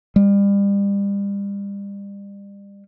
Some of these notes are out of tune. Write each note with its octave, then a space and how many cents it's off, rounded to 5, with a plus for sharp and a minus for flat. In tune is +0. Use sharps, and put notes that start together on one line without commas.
G3 +35